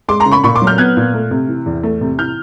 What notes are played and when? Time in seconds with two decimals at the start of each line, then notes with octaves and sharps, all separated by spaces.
0.08 G#3 C6 D6
0.20 A#5 C6
0.26 C#3
0.32 B5 C#6
0.44 A#2 B5 C#6
0.55 C6 D6
0.62 F#3
0.67 F6 G6
0.78 B3 F#6 G#6
0.97 A#2
1.14 A3
1.31 C3
1.48 E3
1.66 E2
1.83 A3
2.01 C3
2.19 E3 F6 G6